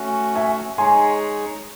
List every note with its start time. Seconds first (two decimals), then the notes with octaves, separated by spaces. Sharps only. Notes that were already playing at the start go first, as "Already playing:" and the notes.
Already playing: A3 C#4 F#4
0.35 E5 G#5
0.78 G#3 D#4 G#4 C#5 G#5 C6